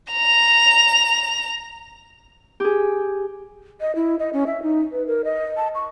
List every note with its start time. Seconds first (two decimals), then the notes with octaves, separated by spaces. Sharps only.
0.12 A#5 F7
2.60 G4 G#4
3.81 D#5
3.95 E4
4.19 D#5
4.33 C#4
4.47 E5
4.62 D#4
4.92 B4
5.07 A#4
5.25 D#5
5.57 A5
5.75 C#6